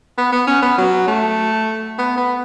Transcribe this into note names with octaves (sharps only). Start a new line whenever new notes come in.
B3
B3
C#4
B3
F#3
A3
B3
B3